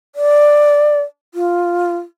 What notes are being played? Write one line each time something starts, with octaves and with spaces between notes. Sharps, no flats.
D5
F4